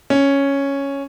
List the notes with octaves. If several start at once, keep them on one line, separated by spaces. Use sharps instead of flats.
C#4